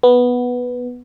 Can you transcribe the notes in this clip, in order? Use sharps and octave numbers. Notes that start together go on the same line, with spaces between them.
B3